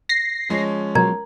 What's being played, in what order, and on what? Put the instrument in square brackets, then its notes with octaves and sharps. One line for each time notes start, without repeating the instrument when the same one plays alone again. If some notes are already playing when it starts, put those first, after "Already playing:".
[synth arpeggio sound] A#6 C7
[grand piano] F3 G#3 C#4
[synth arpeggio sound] B2 F#3 [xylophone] A#4 A#5 G#6